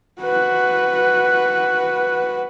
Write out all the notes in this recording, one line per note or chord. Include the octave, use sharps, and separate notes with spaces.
F#4 B4